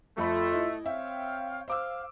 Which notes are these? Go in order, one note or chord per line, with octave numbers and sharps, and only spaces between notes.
F2 A3 F4 B5
E4 D#5
C4 C#5 E5 F5 G5
C5 F5 D6 E6